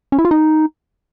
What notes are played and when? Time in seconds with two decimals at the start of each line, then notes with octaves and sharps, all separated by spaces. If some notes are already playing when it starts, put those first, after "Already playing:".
0.12 C#4
0.19 E4
0.25 F4
0.31 D#4